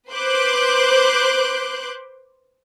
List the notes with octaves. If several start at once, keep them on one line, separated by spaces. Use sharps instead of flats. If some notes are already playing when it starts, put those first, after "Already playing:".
B4 C5 C6 D6 F#6 G6